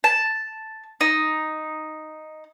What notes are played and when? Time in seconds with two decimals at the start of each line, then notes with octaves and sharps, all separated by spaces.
0.04 A5
1.01 D#4